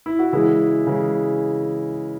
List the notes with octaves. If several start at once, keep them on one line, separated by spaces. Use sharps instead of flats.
E4
F#4
C#3 E3 G#3 E4 G#4
C#3 E3 G#3